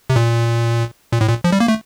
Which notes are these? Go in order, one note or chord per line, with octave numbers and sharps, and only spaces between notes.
C3
A#2
A#2
A2
A#2
F3
G3
A#3
A3